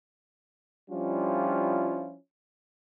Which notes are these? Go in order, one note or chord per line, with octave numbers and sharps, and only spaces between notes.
F3 G3 C#4 D4 E4 F4